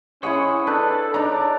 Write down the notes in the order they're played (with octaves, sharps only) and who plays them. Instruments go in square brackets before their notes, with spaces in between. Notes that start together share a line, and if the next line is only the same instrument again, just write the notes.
[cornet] C#4 [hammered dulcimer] E4 G#4 D#5 [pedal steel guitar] C5 C#5 F#5
[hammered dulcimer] D4 [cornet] A4 [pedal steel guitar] B4 F#6 G6
[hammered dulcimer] D4 D5 [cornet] D#4 [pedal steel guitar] C#5 A#5